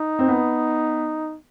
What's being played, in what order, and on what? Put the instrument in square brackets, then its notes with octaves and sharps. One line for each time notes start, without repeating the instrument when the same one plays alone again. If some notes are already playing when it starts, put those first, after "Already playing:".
Already playing: [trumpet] D#4
[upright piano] C4
B3